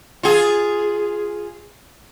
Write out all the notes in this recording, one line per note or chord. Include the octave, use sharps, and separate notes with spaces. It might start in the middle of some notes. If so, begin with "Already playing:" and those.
F4 G#4